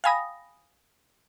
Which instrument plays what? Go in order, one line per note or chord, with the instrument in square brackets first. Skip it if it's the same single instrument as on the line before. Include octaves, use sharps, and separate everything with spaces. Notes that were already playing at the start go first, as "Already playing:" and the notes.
[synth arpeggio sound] F5 G5 G#5 B5 D#6 A#6